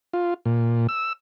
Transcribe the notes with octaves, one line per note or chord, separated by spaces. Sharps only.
F4
A#2
E6